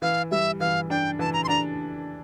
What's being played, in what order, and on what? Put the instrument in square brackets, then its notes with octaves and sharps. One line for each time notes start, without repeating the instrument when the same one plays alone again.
[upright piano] E3 [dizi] F5
[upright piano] G3 [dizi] E5
[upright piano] E3 [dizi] F5
[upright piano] D4 [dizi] G5
[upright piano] E3 [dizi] A5
[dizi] A#5
C6
[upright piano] D4 [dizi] A#5